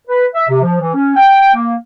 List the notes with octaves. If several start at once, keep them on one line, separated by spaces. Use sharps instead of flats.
B4
E5
C3
F3
E3
C#4
G5
A#3